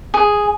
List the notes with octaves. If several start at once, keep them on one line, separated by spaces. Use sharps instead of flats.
G#4